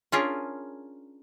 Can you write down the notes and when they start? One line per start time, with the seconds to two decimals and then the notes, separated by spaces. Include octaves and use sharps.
0.12 C#4 D4 F4 G#4 A#4